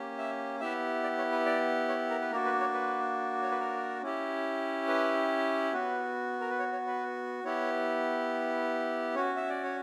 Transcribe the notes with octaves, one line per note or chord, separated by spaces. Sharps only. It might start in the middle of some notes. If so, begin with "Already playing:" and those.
Already playing: A#3 C#4 G4
E5
B3 E4 G4 E5
D5
C#5
B4
D5
C#5
A#4
B4
A#3 D4 F#4 A#4
B4
C#5
B4
C#5
B4
A#4
C#4 E4 G4
B4
B3 F#4 B4
A#4
B4
C#5
C#5
B4
B3 E4 G4 C#5
C#4 F#4 C#5
E5
D5
C#5